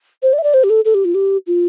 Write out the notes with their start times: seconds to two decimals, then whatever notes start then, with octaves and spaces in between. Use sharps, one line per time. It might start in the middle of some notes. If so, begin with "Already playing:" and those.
0.23 C5
0.33 D5
0.39 E5
0.43 D5
0.54 C5
0.64 G4
0.70 A4
0.85 A4
0.94 G4
1.05 F4
1.14 G4
1.47 F4